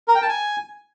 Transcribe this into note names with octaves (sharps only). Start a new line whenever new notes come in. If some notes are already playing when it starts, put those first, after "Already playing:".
A#4
G5
A5
G#5